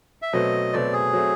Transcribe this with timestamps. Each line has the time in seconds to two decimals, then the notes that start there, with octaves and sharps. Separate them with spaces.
0.22 E5
0.33 B2 F#3 A3 C4 D#5
0.73 B2 F#3 A3 C4 D5
0.93 G#4
1.13 F#3 A3 C4